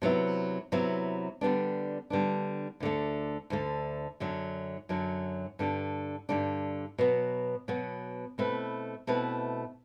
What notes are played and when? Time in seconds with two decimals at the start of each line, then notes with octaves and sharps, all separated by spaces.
0.02 C3 F#3 B3 E4
0.72 C3 F#3 B3 E4
1.41 D3 G3 B3 D4
2.10 D3 G3 B3 D4
2.80 D2 D3 A3
3.50 D2 D3 A3
4.20 F#2 D3 F#3
4.89 F#2 D3 F#3
5.59 G2 D3 G3 D4
6.29 G2 D3 G3 D4
6.98 B2 F#3 B3
7.68 B2 F#3 B3
8.38 B2 A3 C4 E4 B4
9.07 B2 A3 C4 E4 B4